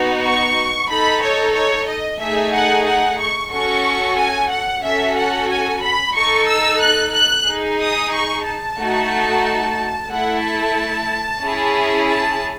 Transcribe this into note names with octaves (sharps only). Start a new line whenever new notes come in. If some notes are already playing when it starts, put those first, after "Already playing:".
Already playing: B3 D#4 F#4
C#6
D#4 A4 B5
C#5
C#5
D#5
A3 D#4 G#4 E5
F#5
F#5
C#6
C#4 F#4 A4 C#6
G#5
F#5
C#4 F#4 A4 E5
F#5
G#5
B5
D#4 A4 C#6
E6
F#6
F#6
D#4 G#4
D#6
C#6
A5
A3 D#4 F#4
A3 E4 A4 F#5
A5
C#4 E4 G#4
A5